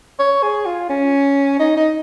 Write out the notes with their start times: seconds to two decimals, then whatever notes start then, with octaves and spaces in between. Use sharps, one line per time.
0.19 C#5
0.43 G#4
0.66 F4
0.89 C#4
1.60 D#4
1.77 D#4